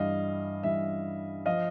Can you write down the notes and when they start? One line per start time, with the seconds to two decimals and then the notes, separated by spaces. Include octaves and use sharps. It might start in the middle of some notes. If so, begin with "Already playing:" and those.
Already playing: G2 E3 D#5 F5
0.63 G2 E3 E5
1.46 F3 D#5 F5